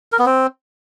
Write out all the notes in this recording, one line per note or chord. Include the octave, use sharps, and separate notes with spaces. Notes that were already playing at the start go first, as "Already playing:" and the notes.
A#4
B3
C4